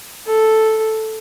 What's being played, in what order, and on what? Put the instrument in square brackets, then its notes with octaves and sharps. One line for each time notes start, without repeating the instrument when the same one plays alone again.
[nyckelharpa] A4